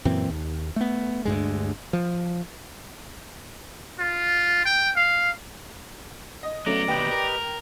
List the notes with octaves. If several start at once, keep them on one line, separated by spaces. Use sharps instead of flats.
F#2 A#2 E3 C4
D#2
A3 B3
D2 G2 G#3
F3
F4
G5
F5
D#5
F#3 A3 B3 C#4 D5 A#5
D#2 B2 G4 B4 D#5 G5
A#4